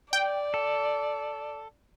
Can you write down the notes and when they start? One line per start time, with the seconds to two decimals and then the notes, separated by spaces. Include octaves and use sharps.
0.13 D5 G5
0.54 A4